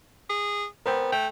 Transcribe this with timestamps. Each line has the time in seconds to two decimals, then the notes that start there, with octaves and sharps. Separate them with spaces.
0.30 G#4
0.86 B3 A#4 C5 G5
1.12 A3 G5